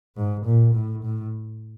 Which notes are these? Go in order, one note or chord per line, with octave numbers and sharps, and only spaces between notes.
G#2
A#2
A2
A2